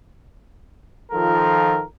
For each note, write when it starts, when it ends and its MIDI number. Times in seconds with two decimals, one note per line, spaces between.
1.12 1.82 51
1.12 1.82 53
1.12 1.82 65
1.12 1.82 69
1.12 1.82 70